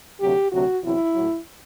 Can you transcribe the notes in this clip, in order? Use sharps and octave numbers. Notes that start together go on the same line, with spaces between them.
D2 C3 F#3 G4
D2 C3 F#3 F#4
E2 C3 F#3 E4
A2 F#3